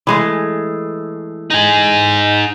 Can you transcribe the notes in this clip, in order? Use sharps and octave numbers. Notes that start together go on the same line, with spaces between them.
E3 G#3 A3
D#4 G#4